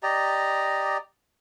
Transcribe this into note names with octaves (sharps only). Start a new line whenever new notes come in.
G4 D5 D#5 A#5